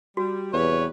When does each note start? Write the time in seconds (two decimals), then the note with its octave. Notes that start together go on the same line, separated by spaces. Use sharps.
0.17 G3 F#4
0.53 E2 C3 G3 B4 C#5